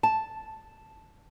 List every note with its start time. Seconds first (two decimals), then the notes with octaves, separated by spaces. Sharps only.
0.03 A5